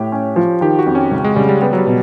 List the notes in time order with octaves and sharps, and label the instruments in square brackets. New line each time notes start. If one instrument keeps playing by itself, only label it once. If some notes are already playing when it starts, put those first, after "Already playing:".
Already playing: [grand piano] A2 [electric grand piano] G4
[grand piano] C#4
F3
[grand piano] D#3 [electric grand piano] G4
[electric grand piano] F#4
[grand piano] F2
[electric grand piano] C#4
[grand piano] C#2
[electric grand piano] G#3
[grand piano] C#3 [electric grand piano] G3
[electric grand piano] G3
[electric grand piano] G3 [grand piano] B3
[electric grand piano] F#3
G3
[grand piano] B2